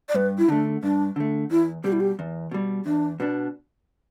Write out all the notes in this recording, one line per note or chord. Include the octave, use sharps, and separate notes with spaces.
D5
G2 B4
E4
D3 A3 D4
G2 D4
D3 A3
E2 E4
B2 G3 G4
E4
G4
E2
B2 G3
E2 D4
B2 B3 D4